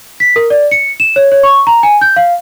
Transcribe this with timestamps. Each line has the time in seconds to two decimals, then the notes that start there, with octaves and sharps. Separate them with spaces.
0.20 B6
0.36 A#4
0.50 D5
0.71 C#7
1.00 E7
1.16 C#5
1.32 C#5
1.43 C#6
1.67 A#5
1.83 G#5
2.01 G6
2.16 F5